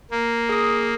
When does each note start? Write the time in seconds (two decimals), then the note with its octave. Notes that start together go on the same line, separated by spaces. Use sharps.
0.11 A#3
0.49 G#4 D#6